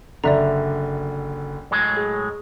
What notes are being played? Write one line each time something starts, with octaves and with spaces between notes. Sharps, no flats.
F#1 D3 D5 E5 A#5
A2 F#3 G#3
G#4